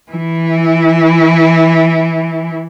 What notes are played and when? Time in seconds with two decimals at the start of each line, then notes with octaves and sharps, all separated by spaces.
0.11 E3 E4